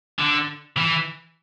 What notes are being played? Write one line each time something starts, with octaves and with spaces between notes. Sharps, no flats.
D3
E3